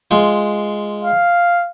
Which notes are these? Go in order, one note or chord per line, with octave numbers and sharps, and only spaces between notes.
G#3 F4
F5